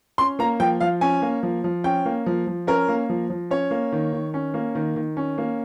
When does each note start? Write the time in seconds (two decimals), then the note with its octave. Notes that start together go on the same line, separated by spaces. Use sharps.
0.18 C#4 C6
0.39 A#3 A#5
0.60 F3 G5
0.80 F3 F5
1.01 C#4 G#5
1.22 A#3
1.43 F3
1.64 F3
1.84 C#4 G5
2.05 A#3
2.26 F3
2.47 F3
2.67 C#4 A#4
2.88 A#3
3.09 F3
3.30 F3
3.51 C#4 C#5
3.71 A#3
3.92 D#3
4.13 D#3
4.34 C#4
4.54 A#3
4.75 D#3
4.96 D#3
5.17 C#4
5.38 A#3